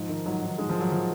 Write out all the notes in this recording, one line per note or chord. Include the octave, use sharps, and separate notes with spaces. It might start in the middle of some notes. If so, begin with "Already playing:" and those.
Already playing: G#2 F3
D#3
G#2 F#3
D#3
G#2 G#3
F3
D#3 F#3
F3